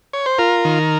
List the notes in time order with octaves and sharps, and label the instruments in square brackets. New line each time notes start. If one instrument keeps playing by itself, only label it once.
[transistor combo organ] C#5
C5
F4 A#4
D#3